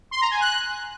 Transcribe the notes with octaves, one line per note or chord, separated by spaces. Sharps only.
C6
A#5
G#5
F#6